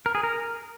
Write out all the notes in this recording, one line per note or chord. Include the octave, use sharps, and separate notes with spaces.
A#4
G#4
A#4